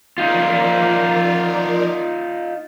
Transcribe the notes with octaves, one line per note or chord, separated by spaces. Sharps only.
F3 D#4 F4 A#4 D5